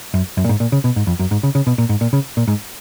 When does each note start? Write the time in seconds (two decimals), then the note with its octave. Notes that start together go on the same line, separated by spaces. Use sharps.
0.14 F#2
0.37 F#2
0.44 A#2
0.49 G#2
0.60 A#2
0.72 C#3
0.84 B2
0.96 G#2
1.07 F2
1.19 F#2
1.31 G#2
1.43 C#3
1.55 C#3
1.67 B2
1.78 A#2
1.89 G#2
2.01 A#2
2.13 C#3
2.37 A#2
2.48 G#2